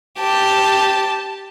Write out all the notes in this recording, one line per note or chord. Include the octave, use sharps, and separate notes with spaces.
G4 A5